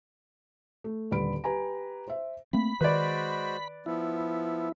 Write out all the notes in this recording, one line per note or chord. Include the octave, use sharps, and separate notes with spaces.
A3
D#1 D3 G3 B4 B5 D7
G4 B4 G#5 A#5
C5 E5
A3 A#3 C4 B5
D#3 G#3 F#4 B4 C5 D5
F3 B3 E4